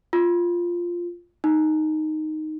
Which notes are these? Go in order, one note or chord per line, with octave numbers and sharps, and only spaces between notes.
F4
D#4